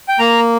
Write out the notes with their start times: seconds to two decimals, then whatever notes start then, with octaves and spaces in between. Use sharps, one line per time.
0.08 G5
0.19 A#3 A#5